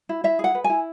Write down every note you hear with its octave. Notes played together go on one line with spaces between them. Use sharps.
E4
E4 E5
G#4 F#5
B4
G#5
E4